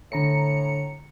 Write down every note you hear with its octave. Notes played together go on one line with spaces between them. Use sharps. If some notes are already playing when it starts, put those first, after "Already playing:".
A2 D3 A#5 C#7